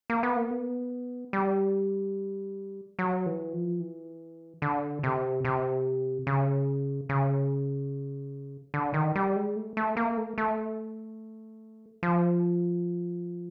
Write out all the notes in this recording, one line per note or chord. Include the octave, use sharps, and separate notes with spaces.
A#3
B3
A#3
B3
G3
F#3
E3
F3
E3
D3
C3
C3
C#3
C#3
D3
D#3
G3
G#3
A3
A3
A#3
A3
A3
F3